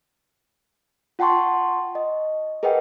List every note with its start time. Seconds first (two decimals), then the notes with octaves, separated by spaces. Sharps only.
1.19 F4 F#5 G5 A5 C6 C#6
1.95 D#5
2.63 G#4 A#4 B4 D#5 F#5 G5